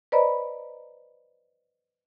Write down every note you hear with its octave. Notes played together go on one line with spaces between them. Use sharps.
B4 C5 D5 D#5 A#5 B5